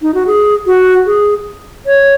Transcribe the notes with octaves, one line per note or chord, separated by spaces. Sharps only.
D#4
F#4
G#4
F#4
G#4
C#5